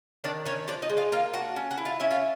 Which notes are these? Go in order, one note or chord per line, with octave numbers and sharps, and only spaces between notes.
D#3 D4 D5
D#3 C#4 C#5
F3 D4 D5
D#4 D#5
G#3
F4 F5
A#3 F4 F5
D4 F#4 F#5
C#4
F#4 F#5
E4
F4 F5
C#4 E4 E5
F4 F5